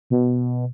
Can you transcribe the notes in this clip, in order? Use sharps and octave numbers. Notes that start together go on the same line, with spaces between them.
B2